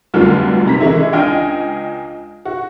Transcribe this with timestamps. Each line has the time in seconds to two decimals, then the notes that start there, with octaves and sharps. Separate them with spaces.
0.14 F1 C2 D3 F#3 F4 F6
0.65 F#1 C3 A#5 B6
0.81 E3 G#3 C#4 E4
1.12 C#2 D4 D#5 G5 G#5 F6
2.45 F#4